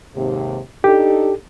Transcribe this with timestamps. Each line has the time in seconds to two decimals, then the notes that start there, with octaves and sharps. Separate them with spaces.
0.15 D#2 G#2 C3
0.84 D4 D#4 G4 A4